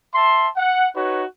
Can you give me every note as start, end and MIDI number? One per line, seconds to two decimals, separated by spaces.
0.14 0.48 76
0.14 0.48 81
0.14 0.48 84
0.56 0.88 78
0.96 1.24 63
0.96 1.24 66
0.96 1.24 71
0.96 1.24 73